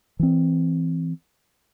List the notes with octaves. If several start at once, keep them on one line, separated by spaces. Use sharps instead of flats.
E3 C4